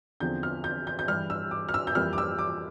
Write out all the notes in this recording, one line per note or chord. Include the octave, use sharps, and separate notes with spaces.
E2 D3 F3 C4 G6
F6
G6
G6
G6
G2 E3 G3 F6
E6
D6
F6
E6
G6
F2 E3 G3 A#3 F6
D6
E6
D6